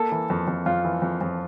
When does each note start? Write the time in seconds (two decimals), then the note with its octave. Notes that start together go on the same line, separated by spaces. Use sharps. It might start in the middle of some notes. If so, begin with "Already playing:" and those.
Already playing: A#3 A4
0.12 E3
0.30 F2
0.48 F2
0.66 F2 F4
0.85 E3
1.02 F2
1.21 F2